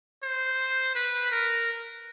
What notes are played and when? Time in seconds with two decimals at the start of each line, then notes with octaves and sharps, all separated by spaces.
0.23 C5
0.95 B4
1.32 A#4